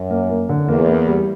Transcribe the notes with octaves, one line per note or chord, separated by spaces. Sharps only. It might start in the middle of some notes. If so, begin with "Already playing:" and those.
Already playing: F#2
A#3
A#3
D3
E2 A#3
A#3
G3